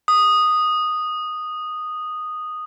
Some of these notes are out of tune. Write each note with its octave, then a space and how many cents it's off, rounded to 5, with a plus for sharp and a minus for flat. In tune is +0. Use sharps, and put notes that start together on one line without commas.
D#6 -5